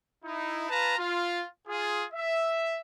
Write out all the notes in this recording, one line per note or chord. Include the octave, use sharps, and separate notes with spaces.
D#4 E4
F4 B4 A5 A#5
F4
F4 G#4
E5